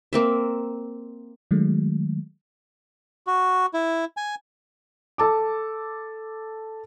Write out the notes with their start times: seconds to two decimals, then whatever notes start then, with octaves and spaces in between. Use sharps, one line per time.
0.13 A#3 C4 E5
1.51 D#3 F#3 G#3 A3
3.27 F#4
3.74 E4
4.17 G#5
5.18 A4 A5 D6